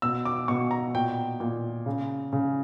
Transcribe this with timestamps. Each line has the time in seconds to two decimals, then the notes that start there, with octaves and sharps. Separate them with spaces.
0.02 B2 E6
0.25 D6
0.48 B2 C#6
0.71 A#5
0.94 A#2 G5
1.40 A#2
1.86 C#3
2.33 C#3